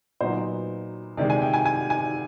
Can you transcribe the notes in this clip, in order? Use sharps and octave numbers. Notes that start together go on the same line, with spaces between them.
A#2 F#3 B3 D#4 C5
C3 D#3 G#3 D5
G#5
G5
G#5
G#5
G#5